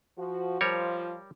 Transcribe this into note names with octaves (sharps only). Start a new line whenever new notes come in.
F3 F#4
F3 G3 A#4 C#5